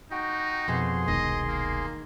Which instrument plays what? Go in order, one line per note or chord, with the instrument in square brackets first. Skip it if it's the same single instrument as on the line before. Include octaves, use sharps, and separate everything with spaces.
[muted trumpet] D#4 [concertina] F#4 G5
[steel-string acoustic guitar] F2 B2 [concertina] G#4 C6
[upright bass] E1 C2 [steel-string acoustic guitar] D#3 [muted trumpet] D#5
[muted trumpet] A#3